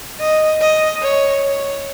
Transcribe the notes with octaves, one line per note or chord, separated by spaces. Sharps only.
D#5
D#5
C#5
C#5